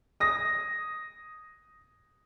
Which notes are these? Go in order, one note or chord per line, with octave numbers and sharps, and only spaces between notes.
D#6 A#6